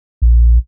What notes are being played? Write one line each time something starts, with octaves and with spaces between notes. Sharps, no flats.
A#1